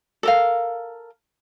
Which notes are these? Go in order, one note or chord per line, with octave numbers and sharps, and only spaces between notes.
A4 A#4 F5